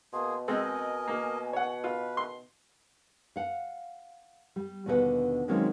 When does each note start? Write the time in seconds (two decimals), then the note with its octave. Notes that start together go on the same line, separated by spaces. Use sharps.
0.13 B2 A#3 G#4 C6
0.48 G#3 C4 A4 A#4 D#5 G#5
1.08 A#3
1.53 C#5 F#5
1.84 F4 B4
2.17 C6
3.36 F5 F#5
4.56 G3
4.86 D#2 B2 D3 G#4 B4 F#5
5.48 D#3 F#3 G#3 A#3 C4 C#4